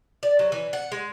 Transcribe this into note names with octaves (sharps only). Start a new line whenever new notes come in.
D5
F#3
E3
F#5
G#3